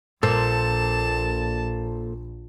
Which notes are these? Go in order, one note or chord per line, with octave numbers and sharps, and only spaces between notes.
A#1 A#2 A4 C5 A5